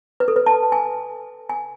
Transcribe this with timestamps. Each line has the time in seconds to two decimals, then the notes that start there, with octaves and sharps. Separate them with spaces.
0.20 B4
0.28 A4
0.36 B4
0.46 A5
0.72 G#5
1.49 G#5